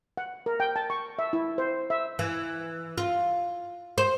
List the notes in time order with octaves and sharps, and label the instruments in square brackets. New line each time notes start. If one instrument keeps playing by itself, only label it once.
[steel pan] F#5
A#4
G5
A5
C#6
E5
E4
C5
E5
[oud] E3
F4
C5